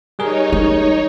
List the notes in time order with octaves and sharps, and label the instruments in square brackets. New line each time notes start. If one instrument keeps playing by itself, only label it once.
[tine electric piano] G3 G#4 A#4 [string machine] D#4 C#5
[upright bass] C#4